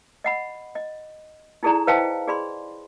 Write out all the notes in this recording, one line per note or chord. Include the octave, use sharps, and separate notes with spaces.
D#5 F#5 B5
D#5
D#4 E4 G#4 A4 D5 A#5
B4 C5 D#5 F5 G5 A5
G#4 D5 B5 C6